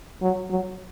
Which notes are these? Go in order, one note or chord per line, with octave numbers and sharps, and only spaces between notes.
F#3
F#3